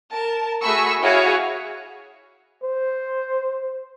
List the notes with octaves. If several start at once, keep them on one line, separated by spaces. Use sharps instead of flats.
A#4 A5
A3 F#4 G#4 B5 C#6 E6
E4 F#4 G#4 C#5 F5
C5